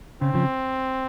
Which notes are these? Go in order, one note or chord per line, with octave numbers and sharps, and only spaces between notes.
C#3 C4
C#3 F3